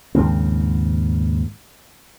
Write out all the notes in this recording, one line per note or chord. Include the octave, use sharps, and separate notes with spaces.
D#2 G#2 C#3 C4